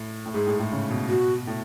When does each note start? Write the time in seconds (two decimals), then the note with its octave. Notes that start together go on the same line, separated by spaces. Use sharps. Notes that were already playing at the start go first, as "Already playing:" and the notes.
Already playing: A2
0.26 A2
0.34 G#2 G#4
0.47 A2
0.59 A2
0.72 C#3
0.90 B2
1.09 F#4
1.47 A2